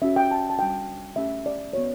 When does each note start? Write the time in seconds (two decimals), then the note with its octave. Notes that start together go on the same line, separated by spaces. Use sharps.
0.02 C#4 F#4 E5
0.16 G5
0.31 A5
0.50 A5
0.59 G3 D4 F#4 G5
1.16 A3 C#4 G4 E5
1.46 D5
1.73 B3 F#4 C#5